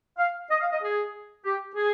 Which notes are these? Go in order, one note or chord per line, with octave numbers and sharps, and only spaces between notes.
F5
D#5
F5
D#5
G#4
G4
G#4